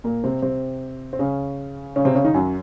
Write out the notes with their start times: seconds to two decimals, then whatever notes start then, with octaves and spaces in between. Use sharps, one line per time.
0.04 A#2 A#3
0.24 C3 C4
0.42 C3 C4
1.13 C4
1.19 C#3 C#4
1.96 C#3 C#4
2.05 C3 C4
2.15 C#3 C#4
2.24 D#3 D#4
2.34 F#2 F#3